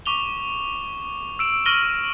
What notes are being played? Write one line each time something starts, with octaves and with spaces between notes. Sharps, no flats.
C#6 D6 F7 G7
E6 D7 E7
C#6 F6 A#6 D#7 F#7 G7